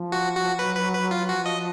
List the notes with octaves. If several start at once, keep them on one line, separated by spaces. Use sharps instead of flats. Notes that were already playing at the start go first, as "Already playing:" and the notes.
Already playing: F3
F#4
F#4
F#3 B4
B4
B4
F4
F3 F#4
D#5